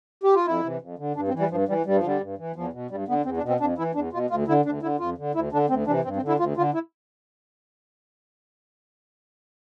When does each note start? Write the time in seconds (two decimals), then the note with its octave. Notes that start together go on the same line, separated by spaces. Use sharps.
0.23 G4
0.35 F4
0.47 F2 E4
0.63 C3 E3
0.81 F2
0.99 D3
1.16 G2 D4
1.28 C4
1.33 E3
1.39 G3
1.50 G2 F3
1.68 E3 G3
1.86 G2 G3
1.96 F3
2.03 D3 G3
2.21 G2
2.38 E3
2.56 E2 F3
2.73 B2
2.90 G2 G3
3.08 D3 B3
3.25 E2 C4
3.37 D4
3.43 B2
3.49 C4
3.60 F2 D4
3.78 E3 E4
3.95 E2 D4
4.12 B2 F4
4.30 D2 F4
4.47 D3 E4
4.65 D2 D4
4.82 D3 E4
4.99 F2 F4
5.18 D3
5.35 D2 E4
5.52 D3 D4
5.69 D2 C4
5.87 C3 E3 D4
6.04 G2 C4
6.16 C4
6.22 D3
6.28 E4
6.39 D2 F4
6.57 D3 F4
6.74 E4